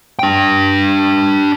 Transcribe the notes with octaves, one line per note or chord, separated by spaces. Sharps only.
D4 G5